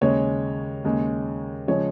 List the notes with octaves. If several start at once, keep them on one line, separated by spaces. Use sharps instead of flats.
D#2 C#3 G#3 C#5
D#2 C#3 G#3
C#3 F3 G#3 C#5